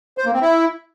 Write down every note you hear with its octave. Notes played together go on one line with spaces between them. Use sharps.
C5
A#3
C4
E4